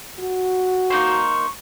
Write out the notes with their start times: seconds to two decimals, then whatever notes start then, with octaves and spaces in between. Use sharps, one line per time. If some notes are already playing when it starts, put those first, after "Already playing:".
0.19 F#4
0.90 A#3 D#4 C5 C#6